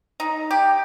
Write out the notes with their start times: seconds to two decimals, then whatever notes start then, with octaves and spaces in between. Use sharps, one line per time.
0.20 D#4
0.51 G4